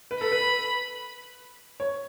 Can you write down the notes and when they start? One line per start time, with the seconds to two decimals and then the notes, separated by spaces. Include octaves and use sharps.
0.11 B4
0.21 A4 B5
0.32 B4
1.80 C#5